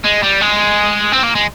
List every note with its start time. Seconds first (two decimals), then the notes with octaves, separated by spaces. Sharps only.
0.05 G#3
0.23 G3
0.42 G#3
1.13 C4
1.23 A#3
1.35 G#3